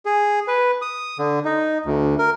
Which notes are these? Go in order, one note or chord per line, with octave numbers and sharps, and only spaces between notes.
G#4
B4
D#6
D3
D#4
D2
A#4